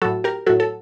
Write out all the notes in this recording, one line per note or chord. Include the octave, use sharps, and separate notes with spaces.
A2 F#3 F#4 A4
G4 A#4
A2 F#3 F#4 A4
A4